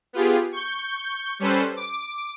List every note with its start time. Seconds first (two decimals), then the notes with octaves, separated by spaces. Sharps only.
0.13 B3 F4 G4 G#4
0.52 C#6 G6
1.39 G3 C#4 A4 B4 C5
1.76 D6